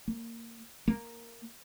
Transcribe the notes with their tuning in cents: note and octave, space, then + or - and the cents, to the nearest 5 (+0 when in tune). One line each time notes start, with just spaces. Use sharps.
A#3 -20
A#3 -5